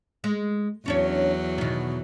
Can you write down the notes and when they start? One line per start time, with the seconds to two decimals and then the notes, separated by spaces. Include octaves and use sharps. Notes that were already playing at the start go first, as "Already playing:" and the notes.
0.24 G#3
0.86 E2 F#3 C#4 D4 C#5
1.58 B2 D#3